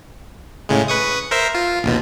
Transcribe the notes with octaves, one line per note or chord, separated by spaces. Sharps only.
A2 C#3 G#3
B4 C#6 D#6
A#4 C5 E5
F4
A#1 D#2 B2